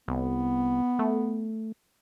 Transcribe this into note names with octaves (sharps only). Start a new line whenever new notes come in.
C2 B3
A3